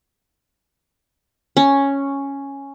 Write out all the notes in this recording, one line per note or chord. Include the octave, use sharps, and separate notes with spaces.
C#4